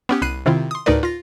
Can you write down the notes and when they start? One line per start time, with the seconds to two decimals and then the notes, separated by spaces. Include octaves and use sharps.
0.09 B3 C#4 G4
0.22 C2 B5 F#6 C7 D#7
0.46 C3 D#3 C4 E4 F4
0.71 C6 D#6
0.86 D2 A2 D#4 A#4 B4 D5
1.03 F4 A#6